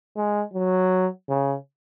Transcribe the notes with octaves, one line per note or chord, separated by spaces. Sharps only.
G#3
F#3
C#3